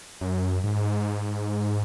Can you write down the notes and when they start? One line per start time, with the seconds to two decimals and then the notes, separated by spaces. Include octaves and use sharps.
0.21 F#2
0.64 G#2